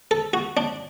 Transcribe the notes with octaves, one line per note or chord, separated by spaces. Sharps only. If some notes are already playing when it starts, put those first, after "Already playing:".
A4
F#4
D4